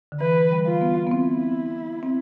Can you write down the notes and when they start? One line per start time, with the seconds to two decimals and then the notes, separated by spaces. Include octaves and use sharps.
0.12 D3
0.21 E3 B4
0.51 G3
0.66 F4
0.81 B3
1.07 B3
1.11 C4 E4
2.03 C4